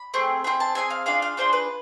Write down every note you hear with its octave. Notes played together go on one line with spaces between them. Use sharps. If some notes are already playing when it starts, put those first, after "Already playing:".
Already playing: B5
A3 C4 G#4
C4 F4 G#4 B5
A5
C4 F4 G#4 G#5
F5
D4 F4 G#4 F5
F5
D4 F4 G#4 C5
B4